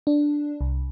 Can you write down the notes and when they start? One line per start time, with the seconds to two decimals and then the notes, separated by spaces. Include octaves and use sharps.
0.07 D4
0.61 C2